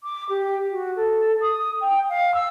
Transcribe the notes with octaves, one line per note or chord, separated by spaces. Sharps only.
D6
G4
F#4
A4
D#6
G5
F5
E6